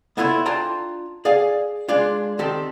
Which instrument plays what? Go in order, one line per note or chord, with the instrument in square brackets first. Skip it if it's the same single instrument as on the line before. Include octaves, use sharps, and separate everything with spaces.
[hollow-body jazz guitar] B3 E4 F4 A4 B4 C#5
D4 F4 G5 A5 A#5
G#4 D5 F5 G#5
G#3 D4 F4
D#3 C4 G4 A4